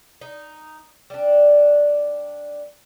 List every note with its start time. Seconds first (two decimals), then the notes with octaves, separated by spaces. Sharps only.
0.21 D#4
1.10 G3 D4